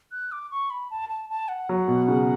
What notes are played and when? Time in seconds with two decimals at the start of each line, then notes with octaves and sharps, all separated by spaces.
0.12 F#6
0.32 D6
0.51 C#6
0.70 B5
0.90 A5
1.09 A5
1.30 A5
1.48 F#5
1.69 F#3
1.88 B2
2.08 C#3